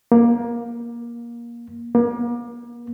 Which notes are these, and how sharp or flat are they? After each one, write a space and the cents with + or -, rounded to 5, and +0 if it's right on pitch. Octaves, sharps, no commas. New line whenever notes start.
A#3 +20
A#3 +40